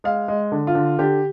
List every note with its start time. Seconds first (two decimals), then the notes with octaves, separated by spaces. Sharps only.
0.04 G#3 F5
0.28 G#3
0.52 D3
0.67 F4
0.75 D3
0.99 D3 G4